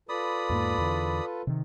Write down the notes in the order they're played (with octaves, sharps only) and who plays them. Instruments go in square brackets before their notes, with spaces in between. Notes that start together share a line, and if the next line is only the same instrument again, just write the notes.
[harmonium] F4 A4 B4 [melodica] D5 B5 D#6
[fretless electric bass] E2 G#2 A#3
E2 D3
C3 D#3